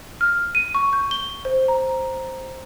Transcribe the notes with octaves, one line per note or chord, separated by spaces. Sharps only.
F6
D#7
C#6
G6
G7
C5
A#5